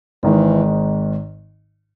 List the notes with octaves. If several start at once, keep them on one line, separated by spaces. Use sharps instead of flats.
G#1 G#2 D#3 E3